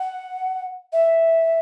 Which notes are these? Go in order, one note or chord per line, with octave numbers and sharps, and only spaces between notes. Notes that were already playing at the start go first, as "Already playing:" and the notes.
Already playing: F#5
E5